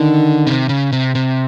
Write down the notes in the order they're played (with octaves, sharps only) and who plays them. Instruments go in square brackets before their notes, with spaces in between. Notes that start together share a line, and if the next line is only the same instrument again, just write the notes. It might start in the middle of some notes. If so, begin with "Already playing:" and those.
Already playing: [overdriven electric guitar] D3 [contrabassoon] D#3
[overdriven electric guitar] C3
C#3
C3
C3